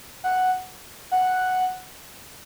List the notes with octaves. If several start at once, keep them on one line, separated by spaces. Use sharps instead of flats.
F#5
F#5